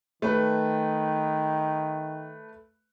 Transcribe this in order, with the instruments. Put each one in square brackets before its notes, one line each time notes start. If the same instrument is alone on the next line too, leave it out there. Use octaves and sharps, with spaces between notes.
[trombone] D#3 [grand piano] A3 B4